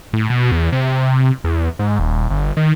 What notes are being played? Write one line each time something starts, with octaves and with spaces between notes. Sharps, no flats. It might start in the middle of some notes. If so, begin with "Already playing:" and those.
A2
B2
E2
C3
E2
G#2
D#1
G1
D#3